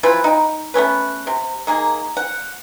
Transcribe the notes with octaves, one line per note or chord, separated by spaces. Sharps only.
E3 F3 F4 B4
D#4 G5
A3 B3 C#4 B4
C3
D#3 A#3 G#4
F#5